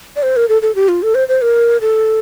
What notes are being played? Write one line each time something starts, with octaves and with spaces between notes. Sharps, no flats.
D5
C5
A#4
A4
A4
G4
F4
A4
C5
C5
A#4
A4